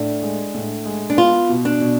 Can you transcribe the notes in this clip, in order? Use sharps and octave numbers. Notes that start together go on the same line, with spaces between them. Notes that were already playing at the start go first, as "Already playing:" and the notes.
Already playing: A2 D4
G#3
A2
G#3
D4
B3 F4
B2
D4
B2